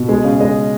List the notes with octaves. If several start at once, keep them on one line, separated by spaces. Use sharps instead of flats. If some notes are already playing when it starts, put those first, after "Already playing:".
Already playing: B2
G#3
C#3
G#3 D#5